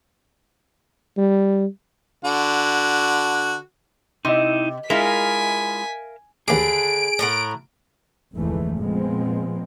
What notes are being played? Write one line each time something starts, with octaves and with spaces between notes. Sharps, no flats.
G3
D3 F#4
C3 D#4 E4 D#5 C6
G#3 E4 F4 A#4 E5 F5 G#5 B6
D#2 D3 G#4 B4 D6 D7
A2 A#4 F#5
F1 D2 G#2 E3 G#3 A3
A#2 F3 G#3 B3 C4